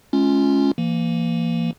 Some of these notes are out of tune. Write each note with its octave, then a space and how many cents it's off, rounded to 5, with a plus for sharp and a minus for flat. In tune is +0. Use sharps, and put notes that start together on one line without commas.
G#3 +35 C#4 +0 F4 -5
E3 +35 A#3 -5